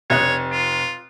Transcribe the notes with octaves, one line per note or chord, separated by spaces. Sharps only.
F1 C#5 D#5 F#6
F4